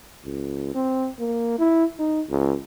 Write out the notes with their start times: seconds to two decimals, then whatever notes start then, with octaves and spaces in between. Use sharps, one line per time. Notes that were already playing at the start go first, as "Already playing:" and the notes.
0.25 C#2
0.75 C4
1.19 A#3
1.59 E4
1.99 D#4
2.30 C#2